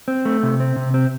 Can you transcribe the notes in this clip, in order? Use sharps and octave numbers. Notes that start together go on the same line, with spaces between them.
C4
A3
C3
C4
C3
C4